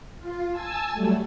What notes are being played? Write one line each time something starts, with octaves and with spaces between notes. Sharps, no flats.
F4
G#5 A5 E6
F#3 G3 A3